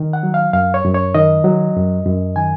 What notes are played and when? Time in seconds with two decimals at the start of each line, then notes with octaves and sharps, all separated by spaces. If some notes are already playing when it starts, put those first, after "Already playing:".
Already playing: D#3
0.13 F#5
0.23 F#3
0.34 F5
0.53 F#2 F5
0.74 C#5
0.84 F#2
0.94 C#5
1.15 D#3 D#5
1.44 F#3
1.76 F#2
2.06 F#2
2.36 D#3 G#5